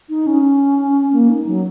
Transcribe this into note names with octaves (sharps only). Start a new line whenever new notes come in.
D#4
C#4
A#3
D#4
F#3